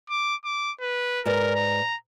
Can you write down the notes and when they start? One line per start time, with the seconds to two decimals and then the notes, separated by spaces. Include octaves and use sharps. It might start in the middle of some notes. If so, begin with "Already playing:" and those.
0.10 D6
0.45 D6
0.81 B4
1.25 G#2 A#4 B4 D5
1.55 A#5